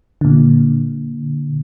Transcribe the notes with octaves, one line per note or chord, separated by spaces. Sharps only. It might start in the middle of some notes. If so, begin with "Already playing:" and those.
A#2 D3